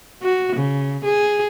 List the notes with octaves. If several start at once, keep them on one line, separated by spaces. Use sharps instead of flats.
F#4
C#3
G#4